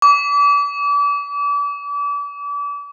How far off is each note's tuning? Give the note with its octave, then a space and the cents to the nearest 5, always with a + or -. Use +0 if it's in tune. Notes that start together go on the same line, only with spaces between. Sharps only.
D6 -35